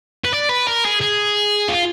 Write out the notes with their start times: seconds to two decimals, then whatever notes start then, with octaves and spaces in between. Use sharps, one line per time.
0.25 B4
0.32 D5
0.49 B4
0.67 A#4
0.84 G#4
1.01 G#4
1.69 F4